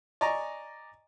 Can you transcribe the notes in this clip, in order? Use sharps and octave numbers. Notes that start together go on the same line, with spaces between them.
D5 D#5 G#5 A#5 C#6